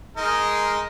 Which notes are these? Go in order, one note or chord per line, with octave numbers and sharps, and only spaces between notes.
G#3 D#4 A#4